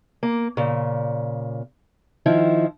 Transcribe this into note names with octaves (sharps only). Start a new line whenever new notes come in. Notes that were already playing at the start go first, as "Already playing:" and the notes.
A#3
A#2 C#3
D#3 F3 E4